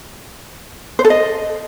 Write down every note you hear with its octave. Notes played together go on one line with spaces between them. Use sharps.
C5
A4
D#5